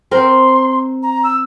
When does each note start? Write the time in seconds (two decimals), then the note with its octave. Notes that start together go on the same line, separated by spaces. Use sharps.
0.11 C4 A#4 G5 C6
1.02 A#5
1.23 E6